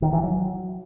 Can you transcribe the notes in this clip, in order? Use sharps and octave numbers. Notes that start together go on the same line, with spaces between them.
D#3
E3
F#3